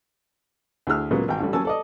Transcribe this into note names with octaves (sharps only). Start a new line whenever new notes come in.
D2 E4 G#4 E6 F6
A#2 C#3 F#3 G#3 A#3 B3
G#1 G5
A1 D3 G3
F#3 A#3 C#4 G#5 A5 E6
A4 D5 D#5